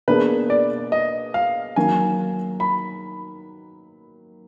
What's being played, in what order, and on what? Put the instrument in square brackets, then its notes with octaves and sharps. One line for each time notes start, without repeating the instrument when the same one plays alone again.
[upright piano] B2 A#3 D4 G#4 [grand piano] B4
[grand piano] D5
D#5
F5
[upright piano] D#3 F#3 A#3 [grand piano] G#5
[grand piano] B5